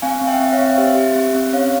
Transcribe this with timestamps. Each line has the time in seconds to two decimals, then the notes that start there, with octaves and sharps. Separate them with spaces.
0.02 C4 F5 G#5
0.21 C4
0.27 E5 G5
0.40 C4
0.47 E5
0.53 C#5 F5
0.59 C4
0.77 G4 C5 E5
0.96 G4
1.16 C4
1.35 C4
1.53 C#4 C#5 F5